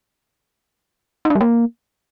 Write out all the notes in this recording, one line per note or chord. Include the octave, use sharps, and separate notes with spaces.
D#4
D4
G3
A#3